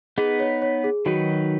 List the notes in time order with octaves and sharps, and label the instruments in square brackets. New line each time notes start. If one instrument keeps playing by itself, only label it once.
[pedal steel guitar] B3 D#4 B4 [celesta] G#4
[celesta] C#5
C#5
G#4
[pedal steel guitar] D#3 F#3 D#4 B4 [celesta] F#4